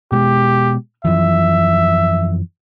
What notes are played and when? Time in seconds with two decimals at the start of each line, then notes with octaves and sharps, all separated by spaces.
0.12 B2 G#3 G4
1.05 F#2 E3 F3 E5